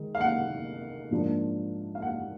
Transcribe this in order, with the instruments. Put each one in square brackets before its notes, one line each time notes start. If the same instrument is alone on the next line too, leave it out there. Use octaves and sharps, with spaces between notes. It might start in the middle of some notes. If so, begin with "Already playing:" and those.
Already playing: [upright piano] D#3 G#3
F5
F#5
G#2 F3 A#3 D4
F5
F#5